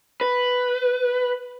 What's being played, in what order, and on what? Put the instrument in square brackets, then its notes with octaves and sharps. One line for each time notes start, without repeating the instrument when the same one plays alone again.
[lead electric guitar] B4